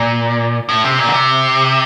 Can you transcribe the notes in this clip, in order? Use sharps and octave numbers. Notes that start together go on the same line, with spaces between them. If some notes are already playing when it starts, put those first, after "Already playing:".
Already playing: A#2
A2
C3
A#2
D3
C3